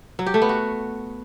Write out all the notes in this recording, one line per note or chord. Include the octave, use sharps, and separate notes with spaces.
F#3
G4
A3
B3
F#4